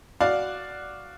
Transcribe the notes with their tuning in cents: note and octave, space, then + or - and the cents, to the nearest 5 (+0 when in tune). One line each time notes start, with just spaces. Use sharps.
F#4 +0 D5 +0 F5 +0